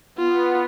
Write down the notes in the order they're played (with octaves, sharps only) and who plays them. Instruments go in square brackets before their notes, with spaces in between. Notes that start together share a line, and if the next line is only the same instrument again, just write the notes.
[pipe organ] B3 [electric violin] F4